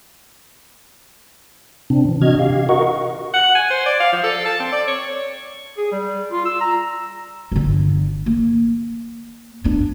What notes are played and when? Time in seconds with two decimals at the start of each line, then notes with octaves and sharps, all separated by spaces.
1.90 C3 C4 D4
2.09 E3
2.22 C3 D4 F#4 D#5 F6 G#6
2.39 G4 F5
2.69 F#4 A#4 D#5 F#5 C#6
3.34 F#5
3.55 G#5
3.70 C5
3.86 D5
4.00 F5
4.12 F3
4.24 A4
4.46 A5
4.60 C4
4.72 D5
4.88 C#5
5.77 G#4
5.92 G3
6.32 F4
6.45 E6
6.61 A#5
7.52 G1 D3
8.26 A#3
9.64 B3 D4